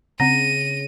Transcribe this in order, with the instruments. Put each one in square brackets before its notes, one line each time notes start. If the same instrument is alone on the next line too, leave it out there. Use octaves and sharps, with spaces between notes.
[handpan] C#3 [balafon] C4 A#5 [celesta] A#6 [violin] D#7